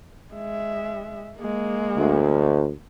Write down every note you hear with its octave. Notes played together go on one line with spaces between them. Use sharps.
G#3 E5
G#3 A#3
D2